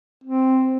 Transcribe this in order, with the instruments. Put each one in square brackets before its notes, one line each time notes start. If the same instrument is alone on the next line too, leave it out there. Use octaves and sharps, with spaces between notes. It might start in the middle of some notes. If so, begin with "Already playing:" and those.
[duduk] C4